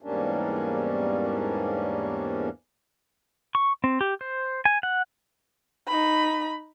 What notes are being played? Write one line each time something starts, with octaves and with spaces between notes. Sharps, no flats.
E2 G#2 G3 A#3 C#4 D4
C#6
C4
G4
C5
G#5
F#5
D#4 B5